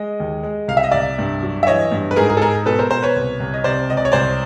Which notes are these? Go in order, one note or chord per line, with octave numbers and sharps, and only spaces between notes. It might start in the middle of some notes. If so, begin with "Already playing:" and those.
Already playing: G#3 D#5
D#2
G#3
C2 F5
E5
D#5
C2 D5 E5
G2
F#3
E5
E3 C#5 D#5
G2
B4
G#2 G#4 A#4
G#4 A#4
A4
G#3 G#4 A#4
B2 A4 B4
A#4 C5
B2 A#4 C5
B4 C#5
C2
C2
D#5
C3 C5 D5
C#2 D#5
D5
C#5
C2 C5 D5